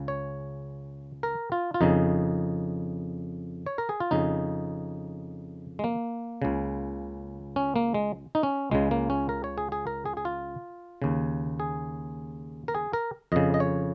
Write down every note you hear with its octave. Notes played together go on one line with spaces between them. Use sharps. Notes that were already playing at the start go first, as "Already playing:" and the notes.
Already playing: C#2 C#3
C#5
A#4
F4
F4
F2 C#3 D#4
C#5
A#4
G#4
F4
F2 C#3 D#4
G#3
A#3
C#2 C#3
C#4
A#3
G#3
D#4
C#4
C#2 C#3 G#3
A#3
C#4
A#4
C#5
G#4
G#4
A#4
G#4
G#4
F4
D#2 C#3
G#4
A#4
G#4
A#4
F2 C#3 D#5
D#5
C#5